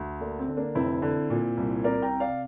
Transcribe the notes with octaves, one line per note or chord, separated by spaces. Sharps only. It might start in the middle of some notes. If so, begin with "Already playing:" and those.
Already playing: D2
D3 A#3
C4
D3
A#3 D4
F1 C4 E4
D3
A#2
C2
C3 A#4 D5
G5 A#5
C3
D5 F5